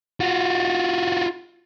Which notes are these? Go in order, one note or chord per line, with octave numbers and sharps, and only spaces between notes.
F4 F#4